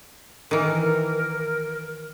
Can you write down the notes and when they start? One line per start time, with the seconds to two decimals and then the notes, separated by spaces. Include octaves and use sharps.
0.51 D#3 E3 A#4